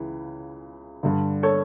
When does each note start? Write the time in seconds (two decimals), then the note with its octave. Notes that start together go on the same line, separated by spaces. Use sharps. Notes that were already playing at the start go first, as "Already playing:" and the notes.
Already playing: C#2 C#3 E3
1.03 G2 D3
1.43 A4 C#5